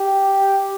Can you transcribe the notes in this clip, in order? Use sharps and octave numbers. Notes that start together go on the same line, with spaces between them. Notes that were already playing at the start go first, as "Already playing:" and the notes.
Already playing: G4